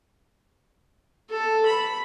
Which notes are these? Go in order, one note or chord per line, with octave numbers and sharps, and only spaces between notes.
A4
B5